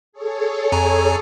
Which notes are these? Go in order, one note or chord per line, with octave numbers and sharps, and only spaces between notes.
G#4 A4 C#5
F2 G#5 A#5